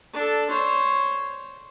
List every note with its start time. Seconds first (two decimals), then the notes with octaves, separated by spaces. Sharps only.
0.13 D4 A4
0.50 C5 C#5